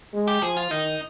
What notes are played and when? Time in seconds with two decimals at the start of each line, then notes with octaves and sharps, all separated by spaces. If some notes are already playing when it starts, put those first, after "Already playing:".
0.13 G#3
0.28 G4
0.42 F3 G#4
0.57 F4
0.71 D#3 D#4